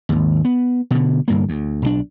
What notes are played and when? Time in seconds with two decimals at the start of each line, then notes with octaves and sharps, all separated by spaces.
0.09 G#1 D#2
0.45 B3
0.91 B2 D3
1.28 G1 G2 A#3
1.49 D2
1.82 B1 D#3 D4